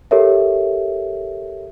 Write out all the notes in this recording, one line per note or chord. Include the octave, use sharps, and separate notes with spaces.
G4 A4 A#4 C#5 E5